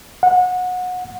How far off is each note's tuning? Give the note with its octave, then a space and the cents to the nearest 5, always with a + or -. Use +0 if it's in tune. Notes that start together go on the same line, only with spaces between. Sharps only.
F#5 -25